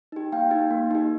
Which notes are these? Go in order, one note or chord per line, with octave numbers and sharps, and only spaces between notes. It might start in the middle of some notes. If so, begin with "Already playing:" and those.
D#4 G4
A#3 F5 G5
D#4 G4
A#3
D#4 G4